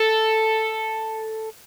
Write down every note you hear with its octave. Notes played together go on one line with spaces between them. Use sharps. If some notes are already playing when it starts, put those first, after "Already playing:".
Already playing: A4